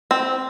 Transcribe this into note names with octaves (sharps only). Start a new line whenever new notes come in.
C4